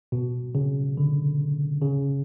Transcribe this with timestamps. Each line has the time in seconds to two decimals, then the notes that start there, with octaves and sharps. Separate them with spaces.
0.12 B2
0.55 C#3
0.97 D3
1.82 C#3